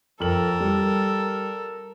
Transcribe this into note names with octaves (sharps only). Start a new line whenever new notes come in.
F2 A4 A#4 F6 F#7
G3